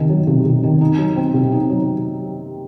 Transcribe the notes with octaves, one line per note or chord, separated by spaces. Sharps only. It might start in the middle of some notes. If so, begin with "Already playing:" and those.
Already playing: C3 D#3
F#3
C3
C3
D#3
D#4
F#3
C4
C3
D#4
F#3